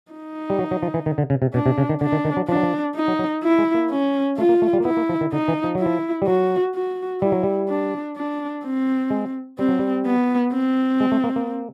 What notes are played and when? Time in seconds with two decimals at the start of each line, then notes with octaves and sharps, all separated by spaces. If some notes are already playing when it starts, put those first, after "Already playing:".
0.12 D#4
0.50 G3
0.59 F#3
0.71 F#3
0.83 F3
0.94 E3
1.06 D#3
1.18 D3
1.30 C#3
1.42 C3
1.54 B2 D4
1.66 C3
1.78 C#3
1.89 D#3
2.01 D3 D4
2.12 D#3
2.25 D#3
2.37 F#3
2.48 F3 D4
2.56 F#3
2.63 F3
2.95 D#4
3.08 F#3
3.19 F#3
3.43 E4
3.58 G#3
3.74 A#3
3.90 C#4
4.37 A3 F4
4.49 A#3
4.62 A3
4.73 G3
4.80 A#3
4.85 B3 E4
4.97 A#3
5.09 F3
5.21 D#3
5.32 D3 D#4
5.48 E3
5.64 F3
5.75 F#3 E4
5.86 F3
6.22 G3
6.27 F#3 F#4
6.75 F#4
7.21 G3 E4
7.32 F#3
7.43 G3
7.69 D4
8.17 D4
8.64 C4
9.10 G#3
9.58 G3 C4
9.68 F#3
9.79 G3
10.06 B3
10.53 C4
11.00 G#3
11.12 A3
11.24 A#3
11.36 A#3